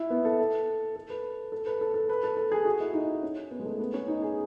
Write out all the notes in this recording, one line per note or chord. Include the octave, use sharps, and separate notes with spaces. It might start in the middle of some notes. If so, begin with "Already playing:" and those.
Already playing: E4
B3
A4
A4
B4
A4
B4
A4
A4
B4
A4
A4
G#4
F#4
E4
D#4
C#4
B3
G#3
A3
B3
C#4
D#4
G#4